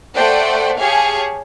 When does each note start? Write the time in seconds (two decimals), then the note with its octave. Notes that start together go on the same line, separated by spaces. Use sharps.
0.14 A3 A4 C5 D5 F#5 G5
0.79 G4 G#4 C#5 F5 G#5 A5